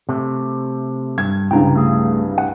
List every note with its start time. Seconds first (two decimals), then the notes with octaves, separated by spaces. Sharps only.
0.09 C3 A3
1.18 G2 G#6
1.51 C2 G2 C#3 G5 A#5
1.75 A3 G#4
2.38 F#5